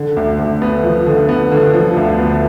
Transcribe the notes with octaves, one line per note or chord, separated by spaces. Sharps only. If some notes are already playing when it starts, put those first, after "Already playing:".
Already playing: D3
D2
D2
B3
F3
D3
B3
D3
F3
D2
B3